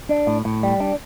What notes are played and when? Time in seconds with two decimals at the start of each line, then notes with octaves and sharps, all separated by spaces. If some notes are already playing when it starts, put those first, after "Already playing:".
0.09 D4
0.27 A2
0.45 A2
0.63 G3
0.80 D4